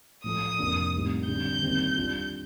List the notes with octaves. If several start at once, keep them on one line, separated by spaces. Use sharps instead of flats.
A2 F3 A3 D#6
F2 C3 F3 A#3 D4
A2 G3 C4 D#4
D3 G3 C4 G6
D#2 D#3 G3 C4
G3 D4 F4